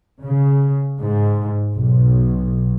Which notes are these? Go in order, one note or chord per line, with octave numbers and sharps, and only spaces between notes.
C#3
G#2
B1